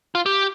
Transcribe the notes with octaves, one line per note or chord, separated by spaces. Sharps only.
F4
G4